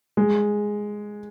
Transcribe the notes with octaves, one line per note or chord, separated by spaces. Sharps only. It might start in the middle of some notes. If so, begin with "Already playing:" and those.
G#3